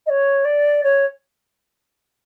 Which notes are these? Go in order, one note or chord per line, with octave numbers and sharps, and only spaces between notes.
D#5
C#5
D5
C#5